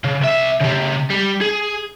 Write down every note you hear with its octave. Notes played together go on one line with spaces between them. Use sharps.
C#3
C2 E5
C#3 G4
G3
G#4